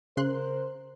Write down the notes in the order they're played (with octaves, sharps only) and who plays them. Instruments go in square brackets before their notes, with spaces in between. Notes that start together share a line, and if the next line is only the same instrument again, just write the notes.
[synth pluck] C#3 C6 F#6 [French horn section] A#4 C5